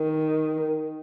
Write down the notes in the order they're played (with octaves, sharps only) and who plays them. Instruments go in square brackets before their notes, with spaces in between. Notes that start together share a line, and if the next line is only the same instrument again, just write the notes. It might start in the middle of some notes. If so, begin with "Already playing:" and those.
Already playing: [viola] D#3